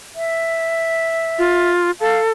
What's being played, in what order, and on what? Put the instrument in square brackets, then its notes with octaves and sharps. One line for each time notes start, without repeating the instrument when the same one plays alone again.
[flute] E5
[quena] F4
[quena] A4 [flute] F5